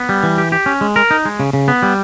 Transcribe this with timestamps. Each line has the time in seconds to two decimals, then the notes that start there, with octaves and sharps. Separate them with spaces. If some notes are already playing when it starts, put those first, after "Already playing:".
Already playing: B3
0.09 G3
0.23 E3
0.38 G4
0.52 G4
0.66 C#4
0.81 G#3
0.96 A#4
1.11 D#4
1.25 G#3
1.40 C#3
1.53 C#3
1.68 B3
1.82 G3